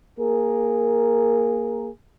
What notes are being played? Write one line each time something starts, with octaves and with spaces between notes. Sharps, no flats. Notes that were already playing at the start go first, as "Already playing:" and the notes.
A#3 G#4 A#4